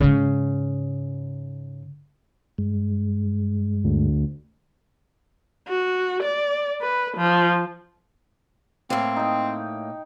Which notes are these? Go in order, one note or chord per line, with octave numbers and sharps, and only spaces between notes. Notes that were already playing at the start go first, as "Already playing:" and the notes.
G#2 C#3
G2 G#3
D2
F#4
D5
B4
F3
A2 A#3 C4
D#4 G5